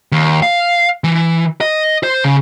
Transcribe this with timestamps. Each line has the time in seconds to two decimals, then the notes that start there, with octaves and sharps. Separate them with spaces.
0.12 D#2
0.42 F5
1.04 E3
1.61 D#5
2.03 C5
2.24 C#3